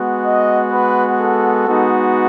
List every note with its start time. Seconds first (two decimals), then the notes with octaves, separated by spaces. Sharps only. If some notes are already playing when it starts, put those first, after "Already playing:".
Already playing: G#3 B3 F#4
0.26 D#5
0.73 B4
1.20 A4
1.68 G#3 B3 D#4 F#4